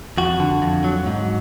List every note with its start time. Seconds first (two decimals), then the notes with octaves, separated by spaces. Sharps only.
0.18 F2 F#4
0.40 D3
0.62 F2
0.84 F#3
1.06 G#2